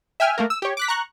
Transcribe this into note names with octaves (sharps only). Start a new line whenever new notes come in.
E5 G5 G#5 F6
A3 A#3 A#4
E6
G4 C#5
D6 F#6 B6
A#5 C#6 F#6